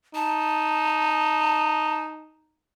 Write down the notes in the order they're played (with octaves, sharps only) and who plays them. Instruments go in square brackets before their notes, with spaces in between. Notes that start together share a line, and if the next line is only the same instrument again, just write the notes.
[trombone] D#4 [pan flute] A5